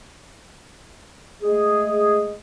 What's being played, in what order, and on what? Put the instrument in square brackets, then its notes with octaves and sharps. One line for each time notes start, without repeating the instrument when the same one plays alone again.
[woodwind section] G#3 A3 G#4